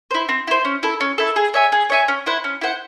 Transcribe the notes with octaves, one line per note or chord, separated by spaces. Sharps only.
E4 C5
C4
E4 C5
C#4
E4 A4
C#4
E4 A4
G#4
C#5 E5 G#5
G#4
C#5 E5 G#5
C#4
E4 C5 F#5
C#4
E4 C5 F#5